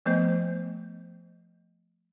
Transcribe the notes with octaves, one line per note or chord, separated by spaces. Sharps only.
F3 A3 B3 C5 D#5